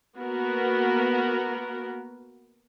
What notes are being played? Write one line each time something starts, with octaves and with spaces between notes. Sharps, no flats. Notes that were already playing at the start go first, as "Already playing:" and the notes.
A#3 B3 F#4 A#4